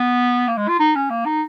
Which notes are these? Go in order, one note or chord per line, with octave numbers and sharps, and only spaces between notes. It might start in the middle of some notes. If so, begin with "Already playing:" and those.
Already playing: B3
A#3
G#3
F4
D#4
C#4
A#3
D#4